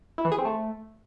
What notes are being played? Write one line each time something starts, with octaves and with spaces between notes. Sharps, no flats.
E4
E3
G#4
C4
A3